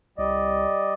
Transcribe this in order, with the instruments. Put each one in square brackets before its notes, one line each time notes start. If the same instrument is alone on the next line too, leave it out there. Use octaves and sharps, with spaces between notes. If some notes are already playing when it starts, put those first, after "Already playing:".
[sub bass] C2 [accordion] G3 D5 D#5